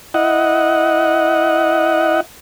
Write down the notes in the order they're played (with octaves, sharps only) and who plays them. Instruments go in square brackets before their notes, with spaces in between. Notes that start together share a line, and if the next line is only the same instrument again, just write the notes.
[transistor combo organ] E4 D#5 F#5